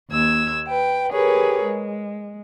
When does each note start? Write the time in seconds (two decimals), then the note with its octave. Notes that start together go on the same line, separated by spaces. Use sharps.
0.10 D#2 E6 G#6
0.68 B4 G5
1.12 G4 G#4 A#4 B4 C#5
1.63 G#3